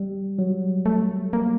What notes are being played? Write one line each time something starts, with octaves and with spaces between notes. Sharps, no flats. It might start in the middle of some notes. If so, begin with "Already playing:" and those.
Already playing: G3
F#3
A3
A#3